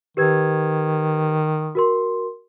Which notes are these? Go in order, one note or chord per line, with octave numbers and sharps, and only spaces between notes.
D#3 G4 B4 G#6
F#4 A#4 C6